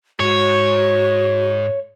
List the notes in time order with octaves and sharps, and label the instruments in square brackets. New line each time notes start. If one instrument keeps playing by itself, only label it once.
[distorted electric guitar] G#2 [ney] F#4 [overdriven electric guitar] C#5